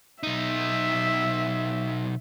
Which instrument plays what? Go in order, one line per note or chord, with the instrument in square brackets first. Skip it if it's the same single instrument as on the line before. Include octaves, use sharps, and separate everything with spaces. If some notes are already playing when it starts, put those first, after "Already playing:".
[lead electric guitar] B1 D#4 [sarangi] E5